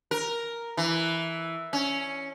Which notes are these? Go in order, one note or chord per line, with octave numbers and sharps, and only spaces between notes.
A#4
E3
C#4